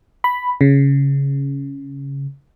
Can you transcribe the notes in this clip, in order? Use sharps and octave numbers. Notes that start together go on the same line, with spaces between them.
B5
C#3